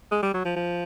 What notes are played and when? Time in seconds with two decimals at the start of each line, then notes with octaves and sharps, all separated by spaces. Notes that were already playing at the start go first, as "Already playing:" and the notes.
0.11 G#3
0.23 G3
0.34 F#3
0.45 F3
0.56 F3